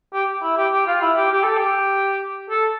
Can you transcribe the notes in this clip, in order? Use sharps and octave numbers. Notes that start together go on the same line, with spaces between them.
G4
E4
G4
G4
F4
E4
G4
G4
A4
G4
A4